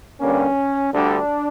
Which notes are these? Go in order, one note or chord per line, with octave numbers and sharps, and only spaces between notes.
G2 D3 G3 A#3 C#4
D2 D3 G3 D4